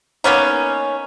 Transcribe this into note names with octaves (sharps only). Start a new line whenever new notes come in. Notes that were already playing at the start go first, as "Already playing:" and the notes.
A#3 B3 C#4 D#4